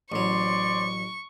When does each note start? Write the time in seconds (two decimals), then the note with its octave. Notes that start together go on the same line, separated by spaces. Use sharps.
0.12 A1 F#3 C5 D5 C6 C#6